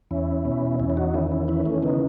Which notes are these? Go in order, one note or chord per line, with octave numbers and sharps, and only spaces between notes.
E2 C#4 E4
B2
E2 C#4 E4
E4
D#4 F#4
D#3 C#4 E4
C#4 E4
E3 C#4 E4
A3 C#4
C#3 B3 D#4